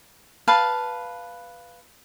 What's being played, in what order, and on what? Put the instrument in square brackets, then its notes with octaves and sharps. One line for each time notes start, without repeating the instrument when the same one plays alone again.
[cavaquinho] B4 F5 A5